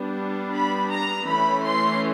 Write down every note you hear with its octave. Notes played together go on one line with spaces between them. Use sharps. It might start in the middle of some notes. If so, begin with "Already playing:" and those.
Already playing: G3 B3 D4
B5
A#5
E3 A3 C#4 B5
C6